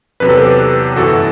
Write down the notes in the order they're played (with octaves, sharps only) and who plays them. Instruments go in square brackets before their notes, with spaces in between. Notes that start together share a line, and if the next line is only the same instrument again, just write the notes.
[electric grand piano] E2 C3 F#3 B4
A4
G4 B4
G1 F#2 E3 F#4 A4